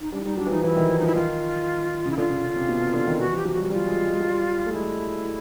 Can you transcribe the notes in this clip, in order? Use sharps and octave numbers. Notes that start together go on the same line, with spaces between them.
D#4
G3 D4
E4
G3 D#4
F#3 D4
E3
F3 D#4
E3 E4
D#3
F3
D#4
F3
E4
D#3 F4
C#3
E4
D3 F4
C#3
C#3
C3
B2
C3
D3
D#3
E3 F#4
F3
G4
F#3
G4
F#4
G3
F#4
G3 F4
G#3
G#3
G3
F#3
G3
A3
G#3 E4